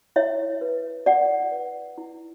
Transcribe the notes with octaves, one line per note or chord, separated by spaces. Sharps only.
E4 C#5 E5
B4
E4 D5 F#5
B4
E4